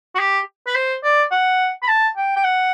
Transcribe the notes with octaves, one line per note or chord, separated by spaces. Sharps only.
F#4
G4
B4
C5
D5
F#5
B5
A5
G5
G5
F#5